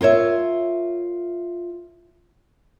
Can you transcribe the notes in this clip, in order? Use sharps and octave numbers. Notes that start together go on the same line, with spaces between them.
F4 A#4 C#5 E5